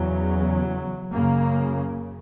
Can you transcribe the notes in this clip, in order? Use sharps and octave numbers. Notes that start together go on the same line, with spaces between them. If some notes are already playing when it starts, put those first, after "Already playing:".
Already playing: E2 C#3 F#3
F#2 C#3 A#3